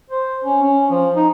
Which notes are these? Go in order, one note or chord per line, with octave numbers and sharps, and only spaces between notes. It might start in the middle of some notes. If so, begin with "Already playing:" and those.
C5
C#4
C#4
F3
D#4